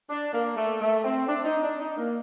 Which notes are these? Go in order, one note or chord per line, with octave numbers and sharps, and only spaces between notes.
D4
A#3
A3
A3
C4
D4
D#4
D4
D#4
A#3